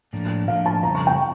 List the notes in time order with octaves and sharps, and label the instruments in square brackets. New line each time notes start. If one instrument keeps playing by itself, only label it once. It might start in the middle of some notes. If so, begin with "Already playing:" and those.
[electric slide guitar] A2 F3 A#3 D4
[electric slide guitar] A2 F3 A#3 D4 [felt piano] F5
[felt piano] A5
[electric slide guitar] F2 C#3 G3 [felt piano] A#5
[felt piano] C#6
G5